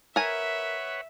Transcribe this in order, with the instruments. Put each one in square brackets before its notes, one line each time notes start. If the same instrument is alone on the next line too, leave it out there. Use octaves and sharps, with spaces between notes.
[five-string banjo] A#4 G#5 [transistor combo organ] B4 C#5 F#5 [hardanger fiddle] E5